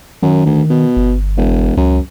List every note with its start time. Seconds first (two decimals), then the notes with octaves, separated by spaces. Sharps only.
0.23 F#2 D#3
0.46 D2
0.70 B2
0.97 G1
1.37 E1
1.77 C#2 F#2